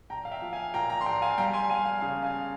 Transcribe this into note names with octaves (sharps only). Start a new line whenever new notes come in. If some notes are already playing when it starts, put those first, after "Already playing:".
A#1 G5 A#5
F5
E5 G5
F3
F5 G#5
A#2 G5 A#5
G5 A#5
C6
A#1 G5 A#5
F5 G#5
G3 G5 A#5
G#5 C6
G3 F5 G#5
F5
C#3 F5
F5 G#5